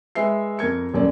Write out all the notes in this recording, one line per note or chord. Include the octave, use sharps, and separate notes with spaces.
G#3 B4 E5 C7
F2 A#4 G#6 C#7
D#1 F#2 D5